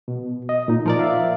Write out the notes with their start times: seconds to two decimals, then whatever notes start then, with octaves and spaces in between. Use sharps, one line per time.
0.08 B2
0.49 D#5
0.68 A#2 D#4
0.86 F3 A#4 D5
0.99 E5 F5